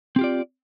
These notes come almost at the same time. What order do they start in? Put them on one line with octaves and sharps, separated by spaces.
C4 G4 F4 D5